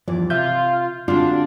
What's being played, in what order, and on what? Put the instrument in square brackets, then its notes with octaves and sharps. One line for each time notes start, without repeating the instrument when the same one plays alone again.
[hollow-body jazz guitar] E2 G2 E3 [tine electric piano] F3 [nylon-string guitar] D5
[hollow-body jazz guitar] C3 E5 [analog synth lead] F4 [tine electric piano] G6
[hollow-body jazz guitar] D3 G#3 C4 [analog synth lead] D4 [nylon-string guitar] F4 F#4